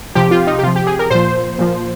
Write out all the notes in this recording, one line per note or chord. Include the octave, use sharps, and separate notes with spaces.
C3 F3 G4
F4
D#4
G4
C3 F3 F4
G4
G#4
A#4
A#2 F3 C5
A#2 F3